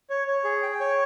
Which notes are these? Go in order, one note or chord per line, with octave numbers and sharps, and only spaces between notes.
C#5
C#5
G#4
G5
C#5